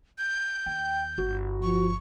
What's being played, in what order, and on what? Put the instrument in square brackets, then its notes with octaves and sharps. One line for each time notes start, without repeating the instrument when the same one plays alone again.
[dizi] G6
[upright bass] D#2 [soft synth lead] G5
[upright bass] G1 [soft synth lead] F#4
[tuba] F3 [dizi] C#6